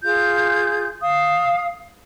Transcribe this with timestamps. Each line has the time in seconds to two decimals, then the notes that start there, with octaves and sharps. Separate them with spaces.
0.04 F4 G#4 G6
1.02 F5 D#6